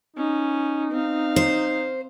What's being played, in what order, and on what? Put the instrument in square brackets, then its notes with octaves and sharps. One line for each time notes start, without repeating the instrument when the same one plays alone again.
[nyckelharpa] C#4 [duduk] D#4
[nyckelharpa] C4 F5
[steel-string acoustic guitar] C5